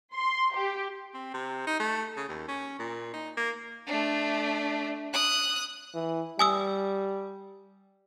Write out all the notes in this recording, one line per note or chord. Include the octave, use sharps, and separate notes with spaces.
C6
G4
C4
C3
D#4
A3
C#3
D#2
C#4
A#2
D#4
A#3
A3 D4
D#6 F#6
E3
G3 G#5 D#6 E6